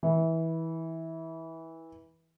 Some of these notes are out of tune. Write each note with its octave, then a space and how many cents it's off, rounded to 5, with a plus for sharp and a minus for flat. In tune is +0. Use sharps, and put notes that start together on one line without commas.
E3 -20